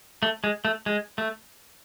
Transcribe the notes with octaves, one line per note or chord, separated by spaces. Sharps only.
A3
G#3
A3
G#3
A3